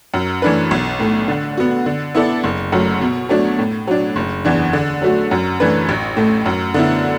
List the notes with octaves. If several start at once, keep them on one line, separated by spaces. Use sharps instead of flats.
F#2
E3 A3 D4 B4
B1
A2 A3
D3
B3 F#4
D3
B3 E4 A4 D5
F#1
F#2 F#3 A3
B2
F#3 A3 D4
A2
F#3 D4
F#1
E2 E3 D4
D3
F#3 A3 F#4
F#2
E3 A3 D4 B4
A1
A2 A3
F#2
D3 B3 E4